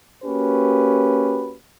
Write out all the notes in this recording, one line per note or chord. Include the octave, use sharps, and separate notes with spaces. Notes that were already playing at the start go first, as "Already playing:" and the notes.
A#3 C#4 F#4 G4 B4